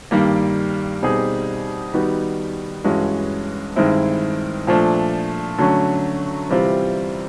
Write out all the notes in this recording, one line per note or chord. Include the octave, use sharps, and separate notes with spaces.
G2 D#3 G3 A#3
B2 G3 C4 D#4 G#4
D#3 G3 B3 D#4 F#4
G2 E3 G#3 C#4 F#4
G2 D#3 G#3 C4 E4
A#2 F3 A3 D4
D3 F#3 A3 C#4
C3 E3 G3 C4 F4